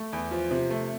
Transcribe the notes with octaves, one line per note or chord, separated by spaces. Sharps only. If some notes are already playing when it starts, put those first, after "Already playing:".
Already playing: A3
E2
F3
C3
A3